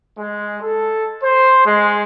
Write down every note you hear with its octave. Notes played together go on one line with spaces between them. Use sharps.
G#3
A4
C5
G#3